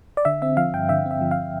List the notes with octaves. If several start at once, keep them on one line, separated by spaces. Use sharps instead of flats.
D5
D3 E5
C4 E5
F3 F5
G2 G5
D3 E5
C4
E5
F3
F5